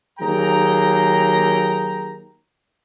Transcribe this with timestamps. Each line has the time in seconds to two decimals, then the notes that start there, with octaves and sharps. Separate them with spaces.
0.20 D#2 F#3 G#4 G5 A#5